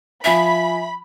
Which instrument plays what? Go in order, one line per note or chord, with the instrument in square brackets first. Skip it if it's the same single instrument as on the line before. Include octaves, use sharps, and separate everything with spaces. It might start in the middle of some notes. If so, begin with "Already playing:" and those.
[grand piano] F3 G#5 F7 [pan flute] E5 [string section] B5